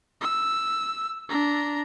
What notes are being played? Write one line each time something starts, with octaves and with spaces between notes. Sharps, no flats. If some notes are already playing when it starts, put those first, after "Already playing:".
E6
D4 A#5